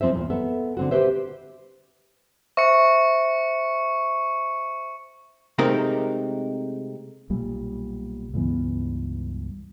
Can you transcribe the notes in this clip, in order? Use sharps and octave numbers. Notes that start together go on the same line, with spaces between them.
F2 F3 C4 C5 E5
E2 A#2
B3 A4 E5
D3 C4 F#4
G4 G#4 B4 C5 E5
C5 E5 C#6 C#7
C3 G#3 A3 C4 D#4 A#4
B1 A#2 G3
C#2 G2 E3 B3